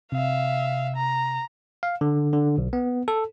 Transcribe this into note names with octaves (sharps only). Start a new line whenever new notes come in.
C3 E5 F5
A#5
F5
D3
D3
B1
B3
A4